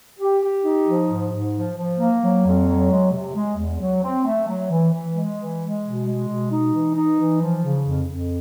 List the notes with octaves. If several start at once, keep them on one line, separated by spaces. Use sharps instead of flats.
G4
G4
D#4
F3
G#2
G#2
F3
F3
A#3
F#3
F2
F#3
G#3
C3
G#3
E2
F#3
C4
A3
F#3
E3
E3
G#3
E3
G#3
B2
G#3
B2
D#4
E3
D#4
E3
F3
C#3
F2
F2